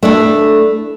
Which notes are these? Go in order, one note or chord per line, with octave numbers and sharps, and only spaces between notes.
A3 D4 E4 A4